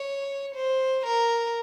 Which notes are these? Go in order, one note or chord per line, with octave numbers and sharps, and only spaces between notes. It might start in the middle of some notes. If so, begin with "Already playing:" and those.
Already playing: C#5
C5
A#4